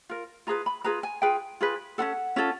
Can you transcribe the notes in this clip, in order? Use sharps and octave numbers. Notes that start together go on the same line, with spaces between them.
F4 A#4
F4 G#4 B4 A#5
B5
F4 G#4 B4 A#5
G#5
F4 G#4 B4 G5
F4 G#4 B4
C#4 F4 A4 F#5
C#4 F4 A4